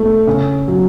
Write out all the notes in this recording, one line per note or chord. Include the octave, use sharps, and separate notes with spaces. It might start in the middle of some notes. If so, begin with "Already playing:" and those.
Already playing: A3
C#3
F#3